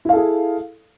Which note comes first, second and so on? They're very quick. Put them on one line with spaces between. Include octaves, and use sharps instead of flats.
E4 F5 A4 G#4